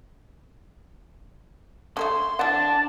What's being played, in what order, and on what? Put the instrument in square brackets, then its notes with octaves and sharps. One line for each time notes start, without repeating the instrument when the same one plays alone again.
[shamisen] D3 G3 A3 [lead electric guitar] C6
[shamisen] E3 F#5 [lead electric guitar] D4 [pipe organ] A5